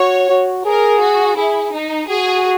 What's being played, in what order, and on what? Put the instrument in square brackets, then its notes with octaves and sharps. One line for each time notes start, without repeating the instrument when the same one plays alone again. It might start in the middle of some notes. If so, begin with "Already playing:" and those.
Already playing: [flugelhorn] F#4 [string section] C#5
[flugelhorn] F#4
[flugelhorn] G#4 [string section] A#4
[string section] F#4
[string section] E4 [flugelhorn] G#4
[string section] D#4
[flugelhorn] F#4 [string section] G#4